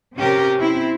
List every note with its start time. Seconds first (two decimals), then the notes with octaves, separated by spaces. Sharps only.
0.17 C3 C#4 G4 A#4
0.57 C4 E4